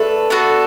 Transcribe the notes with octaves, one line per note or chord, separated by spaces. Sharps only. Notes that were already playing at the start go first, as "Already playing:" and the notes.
Already playing: A3 D4 A4 B4
B3 D4 F#4 A4